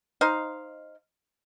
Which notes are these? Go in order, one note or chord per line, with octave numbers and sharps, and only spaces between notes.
D#4 C5 D#5 F5